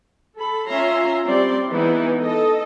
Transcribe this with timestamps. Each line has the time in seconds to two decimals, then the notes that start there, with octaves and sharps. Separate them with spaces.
0.36 A4 B5
0.69 C#4 F4 E5 A#5 C6
1.25 G3 C4 D5 C6
1.69 E3 G#3 B3 D#4 E4
2.23 A4 D#5